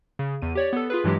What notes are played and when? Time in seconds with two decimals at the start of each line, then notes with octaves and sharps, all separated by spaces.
0.19 C#3
0.42 E2 D#7
0.55 G4 C#5 D5
0.73 B3 A4
0.90 F4 G#4 B4
1.04 G2 E3 F#3 G#3 G4